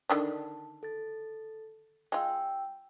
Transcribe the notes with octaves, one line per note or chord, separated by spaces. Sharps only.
D3 D#3 D4 A5
A4 A6
G#3 F4 G5 E6